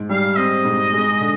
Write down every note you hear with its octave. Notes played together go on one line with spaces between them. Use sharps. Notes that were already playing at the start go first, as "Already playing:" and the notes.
Already playing: G#2
G3 F5
C4 D#5
G#2
G#3
D3